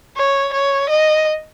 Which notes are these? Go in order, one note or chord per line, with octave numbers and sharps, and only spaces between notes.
C#5
C#5
D#5